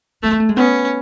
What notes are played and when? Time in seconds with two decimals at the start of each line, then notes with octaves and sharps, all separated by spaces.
0.23 G#3 A3
0.31 B3
0.40 A3
0.49 G#3
0.57 B3 C#4